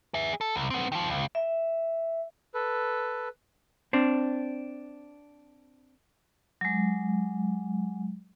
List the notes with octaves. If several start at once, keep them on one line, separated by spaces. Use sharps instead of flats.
G#4 E5
A4
C2
B3 C4
D#3 F3
C#2
E5
A4 B4
C4 D4
F#3 G#3